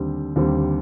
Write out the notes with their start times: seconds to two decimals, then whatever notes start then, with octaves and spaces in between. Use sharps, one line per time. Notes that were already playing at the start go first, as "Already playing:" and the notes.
Already playing: D#2 D3 G3 C4
0.36 D#2 D3 G3 C4